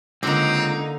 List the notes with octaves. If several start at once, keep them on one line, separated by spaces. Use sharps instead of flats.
C#2 D3 A#3 C4 D#4